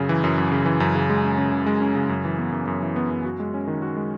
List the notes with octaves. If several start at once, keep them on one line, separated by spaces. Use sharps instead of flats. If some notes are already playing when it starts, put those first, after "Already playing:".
Already playing: F#2 C#3
E3
F#2
F#2
C#3
E3
F#2
C#3
G#3
C#4
C#3
C#3
G#3
C#4
C#3
F#2
E3
B3
F#2
F#2
E3
B3
F#2
F#4
G#3
C#4
D#3
F#4
G#3